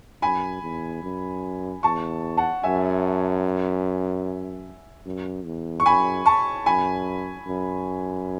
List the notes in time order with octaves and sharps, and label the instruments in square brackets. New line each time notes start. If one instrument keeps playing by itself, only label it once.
[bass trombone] F#2 [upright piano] G#5 B5
[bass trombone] E2
F#2
[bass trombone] E2 [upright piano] A5 C#6
[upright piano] F#5 A5
[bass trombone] F#2 [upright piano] E5 G#5
[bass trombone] F#2
E2
[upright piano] C#6
[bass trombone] F#2 [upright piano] G#5 B5
[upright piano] A5 C#6
[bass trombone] F#2 [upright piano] G#5 B5
[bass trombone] F#2